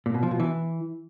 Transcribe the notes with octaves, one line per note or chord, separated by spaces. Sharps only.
A#2
B2
F3
B2
E3